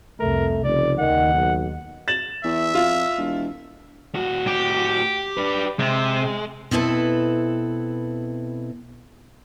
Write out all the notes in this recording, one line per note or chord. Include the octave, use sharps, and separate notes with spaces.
C2 F2 A3 A#4
F1 C#3 D5
D#2 D#3 F#5
B1
A6 E7 F#7
E2 E5
F2 F4
E1
A2 F#4
G4
D4 B4
C3 G#3
B2 C4 E4 A4 B4